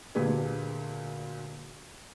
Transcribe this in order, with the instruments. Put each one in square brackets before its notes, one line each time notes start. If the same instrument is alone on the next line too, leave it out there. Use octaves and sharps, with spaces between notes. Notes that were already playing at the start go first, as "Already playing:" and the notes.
[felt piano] D2 A#2 G4 G#4 B4